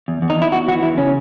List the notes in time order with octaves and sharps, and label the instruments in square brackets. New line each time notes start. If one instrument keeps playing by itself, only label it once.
[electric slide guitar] E2
E2
D#4
E2 E4
E2 F#4
E3 F#4
E2 E4
C#3 C#4